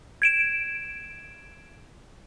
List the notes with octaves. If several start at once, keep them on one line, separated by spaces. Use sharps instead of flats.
G#6 D7 E7